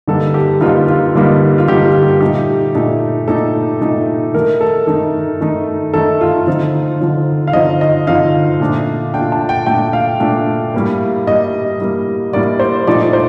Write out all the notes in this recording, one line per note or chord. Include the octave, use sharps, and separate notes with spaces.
G2 D3 G3 A#3 D#4 A4
G4
G2 D3 G3 A#3 D#4 F4
F4
G2 D3 G3 A#3 D#4
F4
G2 D3 G3 A#3 D#4 G4
F4
G4
A#2 A3 D#4 G4
A#2 A3 D#4
A#2 A3 D#4 A4
A#2 A3 D#4
D#3 A3 D#4 A#4
A4
D#3 A3 D#4
D#3 A3 D#4
D#3 A3 D#4 A4
F4
D3 F3 C4 D#4
D3 F3 C4 D#4
F5
D3 F3 C4 D#4 D#5
D#5
D3 F3 C4 D#4 F5
A#2 A3 D4
A#2 A3 D4 G5
A5
G5
A#2 A3 D4 G5
F5
A#2 A3 D4
A2 G3 A#3
A2 G3 A#3 D#5
A2 G3 A#3
A2 G3 A#3 D5
C5
A#2 F3 A3 D#4 D5
C5